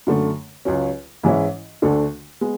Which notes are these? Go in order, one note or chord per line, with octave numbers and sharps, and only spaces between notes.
F#2 D3 A3
C#2 C#3 F#3 C#4
G#2 E3 G#3 C#4 E4
D2 D3 A3 D4 A4
G#3 B3